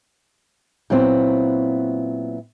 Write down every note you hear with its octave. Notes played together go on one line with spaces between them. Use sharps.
A#2 F#3 B3 C4 E4